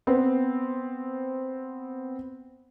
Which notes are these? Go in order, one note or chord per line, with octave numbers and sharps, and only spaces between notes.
B3 C4